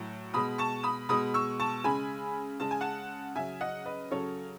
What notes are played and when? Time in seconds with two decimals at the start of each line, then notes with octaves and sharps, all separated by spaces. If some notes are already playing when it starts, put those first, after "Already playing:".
Already playing: A2 F#3
0.34 B2 G#3 B5 D#6
0.58 A5 C#6
0.83 B5 D#6
1.09 B2 G#3 B5 D#6
1.34 C#6 E6
1.60 A5 C#6
1.84 C#3 G#3 G#5 B5
2.60 C#3 G#3 A5
2.71 G#5
2.81 F#5 A5
3.35 C#3 F#3 E5 G#5
3.61 D#5 F#5
3.85 B4 D#5
4.11 C#3 F#3 A4 C#5